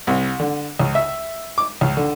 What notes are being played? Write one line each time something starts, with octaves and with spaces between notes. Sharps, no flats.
C2
D3
C#2
E5
D6
C#2
D3